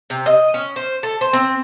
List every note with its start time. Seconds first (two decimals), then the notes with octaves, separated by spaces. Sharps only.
0.10 C3
0.26 D#5
0.54 C#4
0.76 C5
1.03 A4
1.21 C5
1.33 C4